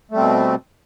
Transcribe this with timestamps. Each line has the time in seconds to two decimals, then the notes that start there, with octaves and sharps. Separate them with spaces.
0.11 A3
0.14 G3
0.17 C4
0.20 B2